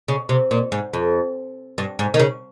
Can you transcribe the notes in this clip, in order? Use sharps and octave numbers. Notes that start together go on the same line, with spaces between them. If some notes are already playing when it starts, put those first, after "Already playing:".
C#3
C3
A#2
G#2
F2
G2
G#2
D#3
C#3